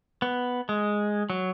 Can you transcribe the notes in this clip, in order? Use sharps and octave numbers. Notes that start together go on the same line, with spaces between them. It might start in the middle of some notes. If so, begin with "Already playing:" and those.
B3
G#3
F#3